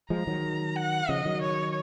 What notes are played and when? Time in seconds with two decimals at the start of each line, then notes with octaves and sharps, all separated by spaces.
0.10 F3 G#3 A#5
0.27 D#3 F#3
0.76 F#5
1.09 C#3 F3 D#5
1.25 D#3 F#3
1.42 C#5